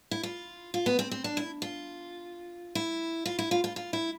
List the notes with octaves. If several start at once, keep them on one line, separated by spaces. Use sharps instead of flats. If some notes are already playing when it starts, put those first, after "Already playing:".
E4
F4
F4
B3
C4
C4
D4
E4
F4
E4
F4
E4
F4
F4
F4
E4